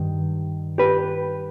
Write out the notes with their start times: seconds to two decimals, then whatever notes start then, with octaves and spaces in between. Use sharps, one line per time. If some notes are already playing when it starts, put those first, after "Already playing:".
Already playing: G2 D#3
0.78 G4 B4